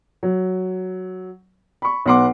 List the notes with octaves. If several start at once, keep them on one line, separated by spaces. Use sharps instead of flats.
F#3
B5 C#6
B1 B3 F#5 C6 D6